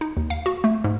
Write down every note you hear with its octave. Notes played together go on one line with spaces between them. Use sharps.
D#4
D#2
F5
F#4
A3
G#2